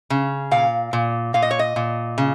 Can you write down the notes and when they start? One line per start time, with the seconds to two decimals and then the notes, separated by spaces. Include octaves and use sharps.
0.10 C#3
0.51 A#2 F5
0.93 A#2
1.34 A#2 F5
1.42 D#5
1.51 C#5
1.59 D#5
1.76 A#2
2.18 C#3